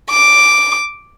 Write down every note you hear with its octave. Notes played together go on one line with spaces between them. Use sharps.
D6